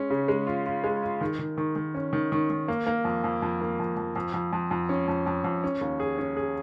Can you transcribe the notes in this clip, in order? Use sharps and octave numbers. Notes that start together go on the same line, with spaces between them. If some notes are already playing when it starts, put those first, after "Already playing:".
Already playing: G#3 C#4
C#3
G#3
F4
F4
G#3
F4
D#3
D#3
D#3
D#3
C#4
D#3
D#3
D#3
A#3
A#3
F2
F2
F2
A#3
F2
F2
F2
F2
F2
F2
C#4
F2
F2
F2
C#4
D#2
G#4
C#4
G#4